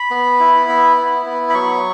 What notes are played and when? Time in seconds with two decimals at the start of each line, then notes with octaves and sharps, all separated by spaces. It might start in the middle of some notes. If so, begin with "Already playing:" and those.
Already playing: B5
0.11 B3
0.40 E4
0.69 B3
0.97 E4
1.26 B3
1.50 B5
1.54 F#3 C#6